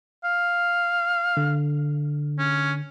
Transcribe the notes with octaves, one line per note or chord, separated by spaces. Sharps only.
F5
D3
C#4